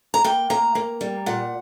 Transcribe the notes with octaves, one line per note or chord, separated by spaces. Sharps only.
A#5
A#3 G5
A#3 A#5
A#3
G3
A#2 F#5